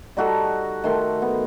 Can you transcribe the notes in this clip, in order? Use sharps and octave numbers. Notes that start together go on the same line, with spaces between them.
G3 D#4 F#4 A4
D#3 A3 C6
B3